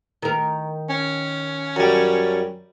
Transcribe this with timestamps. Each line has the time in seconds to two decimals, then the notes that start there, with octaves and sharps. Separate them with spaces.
0.22 D#3 A#4
0.89 C#4
1.76 F#2 G3